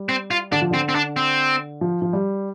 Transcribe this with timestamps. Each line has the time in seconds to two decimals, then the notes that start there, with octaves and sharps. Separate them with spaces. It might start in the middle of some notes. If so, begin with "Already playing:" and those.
Already playing: G3
0.09 C4
0.31 F4
0.52 D3 D4
0.62 F3
0.71 D3 C4
0.89 C4
0.95 D4
1.17 C4
1.81 F3
2.02 F3
2.13 G3